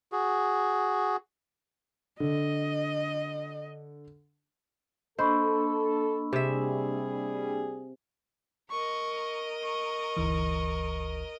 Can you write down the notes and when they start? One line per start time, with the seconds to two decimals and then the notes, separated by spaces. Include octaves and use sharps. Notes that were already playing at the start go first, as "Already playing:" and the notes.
0.12 F#4 G#4
2.20 D3 D#5
5.19 A#3 D4 A4 C5 D#5 B5 C#6 E6
6.33 C3 G3 G#4 E5
8.70 A#4 D#5 C#6
9.63 C#6
10.17 G1 D2 E3